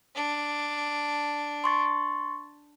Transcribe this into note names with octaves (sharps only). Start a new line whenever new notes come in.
D4
C6 C#6 A6